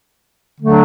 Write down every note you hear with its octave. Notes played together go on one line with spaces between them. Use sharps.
D3 F#3 A3 D4